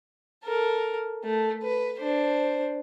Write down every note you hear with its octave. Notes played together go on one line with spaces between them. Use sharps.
A4 A#4
A3
B4
D4 C5